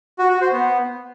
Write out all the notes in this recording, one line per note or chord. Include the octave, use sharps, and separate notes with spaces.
F#4
F#4
C5
B3